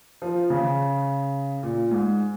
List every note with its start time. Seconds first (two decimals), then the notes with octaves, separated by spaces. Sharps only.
0.22 F3
0.50 C#3
1.63 A#2
1.91 G#2